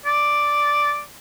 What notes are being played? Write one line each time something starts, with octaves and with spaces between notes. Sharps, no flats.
D5